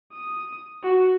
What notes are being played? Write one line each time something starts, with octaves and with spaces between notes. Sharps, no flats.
D#6
F#4